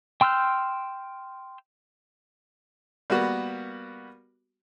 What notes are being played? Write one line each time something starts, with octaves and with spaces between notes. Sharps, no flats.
G5 C6 E6 F6 G6
G3 A#3 B3 F#4